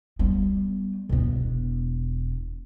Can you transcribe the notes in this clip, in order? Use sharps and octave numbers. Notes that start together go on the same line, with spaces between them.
G3 B3
E1 B3